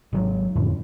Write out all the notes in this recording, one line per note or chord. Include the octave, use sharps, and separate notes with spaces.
G#1 C#3 F#3
F2 A2 D3